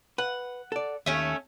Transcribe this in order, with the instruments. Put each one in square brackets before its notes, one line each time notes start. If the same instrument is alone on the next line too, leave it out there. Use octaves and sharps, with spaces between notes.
[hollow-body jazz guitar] B4 [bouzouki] F#5
[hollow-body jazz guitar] A4 D5
[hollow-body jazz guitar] D#2 [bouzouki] A3 C#4 E5